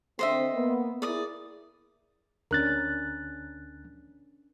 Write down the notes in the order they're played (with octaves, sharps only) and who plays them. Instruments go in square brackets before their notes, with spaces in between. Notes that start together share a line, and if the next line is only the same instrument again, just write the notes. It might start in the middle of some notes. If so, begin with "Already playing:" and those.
[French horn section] D3 C4 [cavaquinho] C5 D#5 E5
[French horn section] A#3 B3
[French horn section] E4 G#4 A#4 [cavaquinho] D5 D#6
[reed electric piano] D2 F#6 A6 [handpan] C#4 D4 A#4